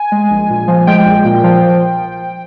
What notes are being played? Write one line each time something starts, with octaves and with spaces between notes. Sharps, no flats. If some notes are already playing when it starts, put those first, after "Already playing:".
Already playing: G#5
G#3
A#1
A#2
F3
G#3 G5
A#1
A#2
F3